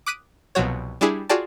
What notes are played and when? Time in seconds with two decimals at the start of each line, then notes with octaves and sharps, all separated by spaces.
0.06 D6 D#6 F#6 B6 D7 D#7
0.55 C2 B2 F3 F#3 F#4 C#5
1.01 G3 D4 E4 G#4
1.29 F4 F#4 G#4 D5 G5 A5